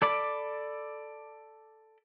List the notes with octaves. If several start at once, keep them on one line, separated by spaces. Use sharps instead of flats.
A4 D5 B5 D6